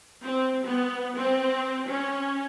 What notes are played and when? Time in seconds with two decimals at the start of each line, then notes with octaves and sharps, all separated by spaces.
0.24 C4
0.66 B3
1.18 C4
1.90 C#4